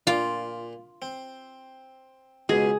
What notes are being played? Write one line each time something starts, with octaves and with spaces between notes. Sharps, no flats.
A#2 F4 D6
C4
C#2 B2 G#4